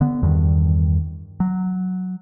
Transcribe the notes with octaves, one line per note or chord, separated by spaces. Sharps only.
D3 B3
E2 G2 D#3
F#3